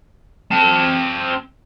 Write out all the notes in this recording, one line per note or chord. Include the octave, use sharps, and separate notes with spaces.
C4 A5